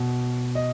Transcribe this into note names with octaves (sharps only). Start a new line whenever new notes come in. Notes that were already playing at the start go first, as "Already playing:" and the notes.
Already playing: B2
D#5